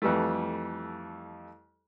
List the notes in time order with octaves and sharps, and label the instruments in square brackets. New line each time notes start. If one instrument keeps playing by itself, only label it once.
[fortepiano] F2 E3 G3 A3